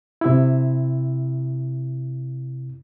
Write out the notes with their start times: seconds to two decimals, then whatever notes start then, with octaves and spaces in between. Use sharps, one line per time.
0.21 C3 E4